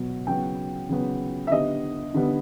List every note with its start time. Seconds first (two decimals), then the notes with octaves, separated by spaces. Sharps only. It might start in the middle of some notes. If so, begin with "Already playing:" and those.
Already playing: B2 F#3 B3
0.27 C#3 F#3 B3 G5
0.89 C#3 F#3 B3
1.47 E5
1.52 D3 G3 B3 D#5
2.14 D3 G3 B3